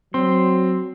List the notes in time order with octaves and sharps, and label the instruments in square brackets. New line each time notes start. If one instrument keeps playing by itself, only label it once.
[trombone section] F#3 [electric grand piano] C4 [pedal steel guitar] C6